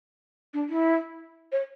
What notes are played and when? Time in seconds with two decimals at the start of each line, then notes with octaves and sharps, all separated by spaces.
0.53 D4
0.69 E4
1.52 C#5